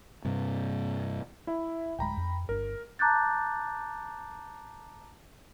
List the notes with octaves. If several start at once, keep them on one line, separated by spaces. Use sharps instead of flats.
G2 C3
E4 E5
D1 G#3 G5 A#5 B5
F2
G1 D4 A#4
A5 A#5 D6 F#6 G6 A6